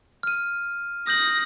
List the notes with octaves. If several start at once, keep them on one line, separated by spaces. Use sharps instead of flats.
F6 D#7
D#6 G6 A#6 F#7